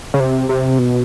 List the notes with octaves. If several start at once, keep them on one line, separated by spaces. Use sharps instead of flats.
C#3
C3
C3
B2